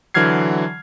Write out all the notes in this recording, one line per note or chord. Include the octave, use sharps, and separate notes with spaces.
D3 E3 F#3 F6 G#6 C7